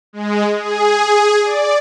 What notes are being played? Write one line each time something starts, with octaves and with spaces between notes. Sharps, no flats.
G#3
G#4
D5